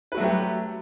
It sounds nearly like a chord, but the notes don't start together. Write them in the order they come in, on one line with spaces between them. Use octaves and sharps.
B4 F#4 A3 F#3 G4